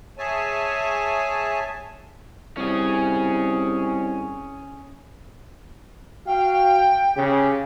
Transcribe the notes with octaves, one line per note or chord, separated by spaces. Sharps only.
G#4 C#5 E5 G#5 A5
C2 C#4 G#4
F#4 F5 G5
C#3 G4